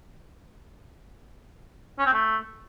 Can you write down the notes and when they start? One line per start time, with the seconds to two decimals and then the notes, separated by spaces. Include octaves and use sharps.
1.99 C#4
2.06 C4
2.13 A3